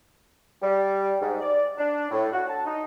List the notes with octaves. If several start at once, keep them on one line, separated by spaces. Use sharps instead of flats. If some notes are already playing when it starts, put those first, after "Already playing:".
G3
G#2
D5
D4
A2
F#4
A5
D#4